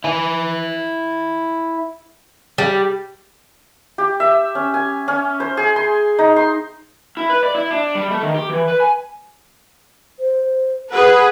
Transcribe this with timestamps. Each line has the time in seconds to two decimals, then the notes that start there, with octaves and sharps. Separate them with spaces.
0.04 E4 G#5
2.58 G3
3.98 G4
4.20 E5
4.55 C#4
4.74 G#5
5.08 C#4
5.40 C5
5.57 G#4
5.76 C6
6.19 D#4
6.36 C6
7.17 E4
7.30 B4
7.43 D5
7.55 E4
7.71 D4
7.95 G3
8.11 A3
8.22 D#3
8.35 G4
8.49 E3
8.68 B4
8.80 G#5
10.19 C5
10.92 G#4 B4 F#5